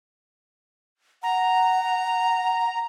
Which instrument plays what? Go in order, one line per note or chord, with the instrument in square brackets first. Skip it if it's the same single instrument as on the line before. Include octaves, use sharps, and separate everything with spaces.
[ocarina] F#5 [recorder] A#5